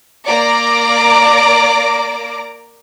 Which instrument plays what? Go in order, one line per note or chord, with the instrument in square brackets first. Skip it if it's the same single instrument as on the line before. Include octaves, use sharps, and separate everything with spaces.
[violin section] A#3 D5 A#5 D6